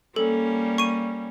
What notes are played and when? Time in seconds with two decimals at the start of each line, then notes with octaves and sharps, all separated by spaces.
0.16 G3 A#3 C#4 A4
0.78 C#6 D#7